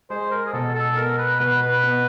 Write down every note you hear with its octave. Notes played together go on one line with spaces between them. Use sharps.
G#3 C5
A#4
G#4
B2 A4
A4
B3 A#4
B4
B2 B4
B4
B3